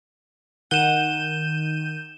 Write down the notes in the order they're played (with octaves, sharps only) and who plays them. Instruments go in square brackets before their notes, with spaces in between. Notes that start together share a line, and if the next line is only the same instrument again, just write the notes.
[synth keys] D#3 G6 D#7 [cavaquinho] F#5 [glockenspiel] E7 G7